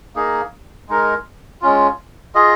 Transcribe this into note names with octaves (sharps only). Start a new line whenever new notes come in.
A#3 D#4 G#4
G#3 D#4 A#4
G#3 C#4 F4
F4 G#4 D#5